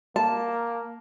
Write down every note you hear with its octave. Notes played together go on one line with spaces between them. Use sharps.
A#3 A5